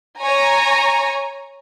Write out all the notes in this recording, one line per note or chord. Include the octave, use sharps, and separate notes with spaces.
C#5 G#5 A#5